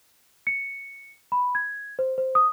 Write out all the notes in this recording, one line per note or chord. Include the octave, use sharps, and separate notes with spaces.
C#7
B5
G#6
C5
C5
D#6